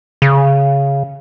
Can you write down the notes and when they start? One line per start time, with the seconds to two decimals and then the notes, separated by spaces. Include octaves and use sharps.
0.22 C#3